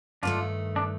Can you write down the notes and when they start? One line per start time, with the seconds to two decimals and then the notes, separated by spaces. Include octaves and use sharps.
0.23 G2 D#3 A3 D4 F4
0.76 D4